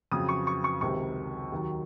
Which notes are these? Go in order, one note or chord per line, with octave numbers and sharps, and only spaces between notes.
F2 C#3 F#3 D#6
C#6
C#6
C#6
C#2 C3 D#3 F#3 C#6
D#2 D#3 F#3